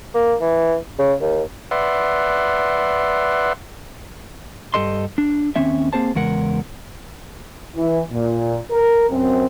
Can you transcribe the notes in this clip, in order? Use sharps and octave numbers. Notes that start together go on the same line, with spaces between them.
A#3
E3
C#3
D#2
B4 D5 E5 F#5 C6
G2 G4 A4 D#5 C6
D4
D#2 C4 C#4 E5
A#3 C4 G#4 C5 A5
E2 C#3 G#3 A#4 F#5
E3
A#2
A#4
F#2 C4